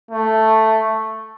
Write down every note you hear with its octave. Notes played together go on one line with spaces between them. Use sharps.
A3